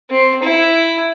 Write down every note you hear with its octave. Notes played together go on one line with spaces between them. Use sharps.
C4
E4